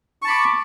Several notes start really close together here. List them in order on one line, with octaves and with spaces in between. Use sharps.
C#6 A5 B5 D6